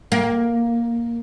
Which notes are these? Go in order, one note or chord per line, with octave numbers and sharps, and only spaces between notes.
A#3